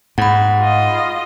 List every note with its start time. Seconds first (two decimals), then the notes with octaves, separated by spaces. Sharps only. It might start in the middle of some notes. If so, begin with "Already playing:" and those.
0.18 G#2 F#5 B5
0.60 F4 D#5